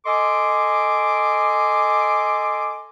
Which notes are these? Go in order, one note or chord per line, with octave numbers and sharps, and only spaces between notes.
A4 D#5 G#5 C6 D6